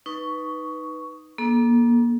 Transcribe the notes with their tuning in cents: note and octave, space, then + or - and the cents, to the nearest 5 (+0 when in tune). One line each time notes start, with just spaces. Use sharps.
D#4 +0 B4 +0 C#6 +10
A#3 +30 D4 +15 A4 -25